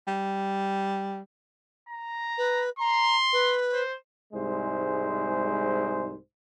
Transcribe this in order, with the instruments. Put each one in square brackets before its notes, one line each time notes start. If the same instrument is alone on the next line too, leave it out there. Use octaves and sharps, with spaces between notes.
[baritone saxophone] G3
[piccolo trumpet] A#5
[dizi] B4
[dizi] A#5 [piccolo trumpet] C6
[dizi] B4
[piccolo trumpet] C5
[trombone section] C2 G#2 G#3 C5